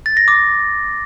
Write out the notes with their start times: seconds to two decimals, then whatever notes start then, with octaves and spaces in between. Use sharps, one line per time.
0.06 A6
0.17 A#6
0.28 D6